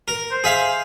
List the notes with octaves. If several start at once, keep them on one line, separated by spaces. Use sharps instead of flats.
A#4
C5
G#4 E5 F5